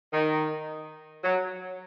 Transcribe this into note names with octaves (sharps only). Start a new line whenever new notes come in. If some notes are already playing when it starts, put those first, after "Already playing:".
D#3
F#3